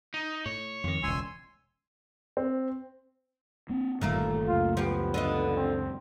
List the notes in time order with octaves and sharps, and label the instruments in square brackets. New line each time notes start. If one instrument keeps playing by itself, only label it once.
[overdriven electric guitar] D#4
[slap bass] A2 [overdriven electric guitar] C#5
[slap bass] F2 D#3
[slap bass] E1 C#2 [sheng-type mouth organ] G#5 C6 E6
[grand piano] C4
[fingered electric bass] A#3 C4
[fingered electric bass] G1 D#3 [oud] A#2 A3 A#3
[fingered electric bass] C#2 F#2 [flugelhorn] F4
[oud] F3 G4 [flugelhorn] B3
[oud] D3 F4 D#5
[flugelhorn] C4